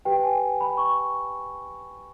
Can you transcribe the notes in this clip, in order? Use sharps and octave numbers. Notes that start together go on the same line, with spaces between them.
G4 B4 G5
G5
G#5
B5
C#6